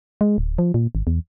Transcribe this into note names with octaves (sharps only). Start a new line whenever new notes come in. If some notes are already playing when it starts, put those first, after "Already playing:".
G#3
D1
F3
A#2
G#1
E2